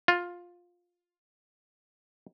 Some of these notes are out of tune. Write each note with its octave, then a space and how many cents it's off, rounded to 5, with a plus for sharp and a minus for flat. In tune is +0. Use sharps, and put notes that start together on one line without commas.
F4 +10